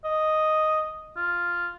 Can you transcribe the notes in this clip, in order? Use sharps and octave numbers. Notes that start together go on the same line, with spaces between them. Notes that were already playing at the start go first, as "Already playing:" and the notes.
D#5
F4